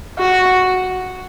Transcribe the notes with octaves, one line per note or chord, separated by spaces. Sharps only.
F#4